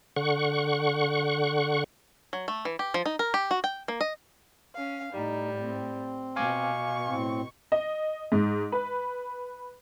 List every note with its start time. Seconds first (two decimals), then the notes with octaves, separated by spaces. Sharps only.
0.16 D3 F#5 C#6
2.33 F#3
2.48 A3
2.65 E3
2.79 G4
2.94 F3
3.06 D#4
3.19 A#4
3.34 G4
3.51 F#4
3.64 G5
3.88 A#3
4.01 D#5
4.74 C#4 F5
5.13 A2 G3 D#4
5.58 C4
6.36 B2 F5 G#5 C#6 D6
7.05 A2 C4
7.72 D#5
8.32 G#2
8.72 B4